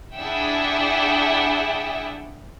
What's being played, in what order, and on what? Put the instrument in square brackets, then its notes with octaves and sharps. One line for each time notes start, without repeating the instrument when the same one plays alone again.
[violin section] D4 E4 G#4 E5 F#5 G5